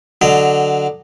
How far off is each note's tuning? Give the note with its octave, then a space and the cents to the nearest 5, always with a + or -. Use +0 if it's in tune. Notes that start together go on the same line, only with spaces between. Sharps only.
D3 +0 F#3 +5 D#5 -10